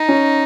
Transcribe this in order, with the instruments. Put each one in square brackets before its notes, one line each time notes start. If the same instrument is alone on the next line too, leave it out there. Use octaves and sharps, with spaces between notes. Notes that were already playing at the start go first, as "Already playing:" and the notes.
Already playing: [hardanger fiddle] D#4
[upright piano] C#4